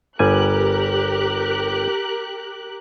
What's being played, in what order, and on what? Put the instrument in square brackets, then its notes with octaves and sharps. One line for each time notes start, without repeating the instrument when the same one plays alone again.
[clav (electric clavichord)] G1 G3 G#5 [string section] G4 A#4 F#6